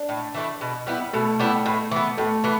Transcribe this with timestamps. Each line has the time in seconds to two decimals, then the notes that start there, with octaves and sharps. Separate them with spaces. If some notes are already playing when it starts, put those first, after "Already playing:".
Already playing: D4
0.09 A2
0.35 E3 A3 E4
0.61 B2
0.87 G3 B3 E4
1.13 B2 A3
1.40 G3 B3 E4
1.66 A2
1.91 E3 B3
2.17 A2 A3
2.44 E3 B3